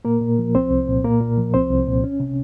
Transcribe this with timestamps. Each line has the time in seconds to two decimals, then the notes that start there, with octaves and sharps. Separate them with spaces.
0.05 A#2 A#3 A#4
0.21 A#2
0.39 F3
0.55 C2 C4 C5
0.71 C2
0.88 A#2
1.04 A#2 A#3 A#4
1.21 A#2
1.38 F3
1.54 C2 C4 C5
1.71 C2
1.87 A#2
2.04 C#4
2.20 C3